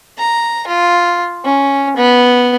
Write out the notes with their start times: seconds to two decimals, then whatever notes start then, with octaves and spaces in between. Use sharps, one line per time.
0.18 A#5
0.67 F4
1.45 C#4
1.97 B3